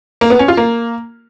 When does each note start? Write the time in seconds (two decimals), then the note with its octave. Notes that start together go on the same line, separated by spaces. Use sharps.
0.21 A#3
0.30 B3
0.39 C#4
0.48 F4
0.57 A#3